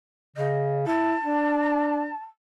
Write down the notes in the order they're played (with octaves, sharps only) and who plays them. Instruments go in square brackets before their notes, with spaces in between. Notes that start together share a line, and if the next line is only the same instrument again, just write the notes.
[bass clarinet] C#3 [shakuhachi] D#5
[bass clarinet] E4 [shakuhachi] A5
[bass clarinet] D4